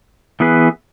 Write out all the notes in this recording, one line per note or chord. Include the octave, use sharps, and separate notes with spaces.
E3 B3 G#4 B4